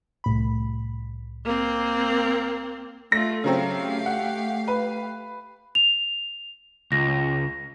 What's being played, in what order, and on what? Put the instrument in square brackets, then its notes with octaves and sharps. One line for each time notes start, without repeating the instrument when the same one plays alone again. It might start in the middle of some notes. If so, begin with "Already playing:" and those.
[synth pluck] C2 A2 B5
[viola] A#3 C4
[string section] A3 F4 [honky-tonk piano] A#6
[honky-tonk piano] C#3 F#3 C4 [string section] A3 G4 F5
[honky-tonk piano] F#5
B4
[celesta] F7
[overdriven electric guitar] C#2 [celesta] A#6